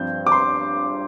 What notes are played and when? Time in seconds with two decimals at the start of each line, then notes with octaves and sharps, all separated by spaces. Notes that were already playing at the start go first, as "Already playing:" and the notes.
Already playing: G2 F3 C4 G6
0.26 D6
0.32 C6